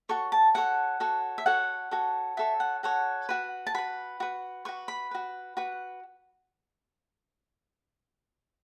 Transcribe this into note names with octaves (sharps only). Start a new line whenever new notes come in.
F#4 A4 C#5 C#6
A5
F#4 A4 C#5 F#5
F#4 A4 C#5
E5
F#4 A4 C#5 F#5
F#4 A4 C#5
F#4 A4 C#5 E5
F#5
F#4 A4 C#5 F#5
F#4 B4
A5
F#4 B4 B5
F#4 B4
F#4 B4 C#6
B5
F#4 B4
F#4 B4